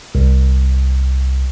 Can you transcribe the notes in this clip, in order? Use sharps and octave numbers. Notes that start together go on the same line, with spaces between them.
C2